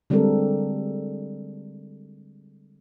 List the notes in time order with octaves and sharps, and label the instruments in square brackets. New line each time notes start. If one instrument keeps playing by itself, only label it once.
[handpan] D3 G3 G#3 C4 A4 A#4